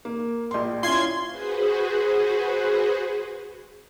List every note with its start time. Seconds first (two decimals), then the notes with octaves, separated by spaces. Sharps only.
0.05 A#3
0.51 A#1 C6
0.83 C#4 E4 F4 C6 G#6
1.29 F#4 G#4 B4 C5